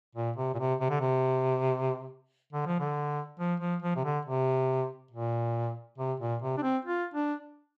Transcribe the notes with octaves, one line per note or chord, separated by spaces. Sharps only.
A#2
C3
A#2
C3
C3
D3
C3
D3
F3
D3
F3
F3
F3
C3
D3
C3
A#2
C3
A#2
C3
D4
C4
F4
D4